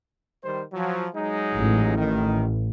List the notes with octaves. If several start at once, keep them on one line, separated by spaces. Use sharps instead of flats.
D#3 G3 C5
F3 F#3
F#3 G#3 D#4
A1
D#3